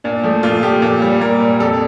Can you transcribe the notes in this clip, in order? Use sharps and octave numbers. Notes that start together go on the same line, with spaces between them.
A#2 D4
F3 A3
A#2 F4
F3 A3 G4
A#2
G3
A#2 A#4
G3
F2 A4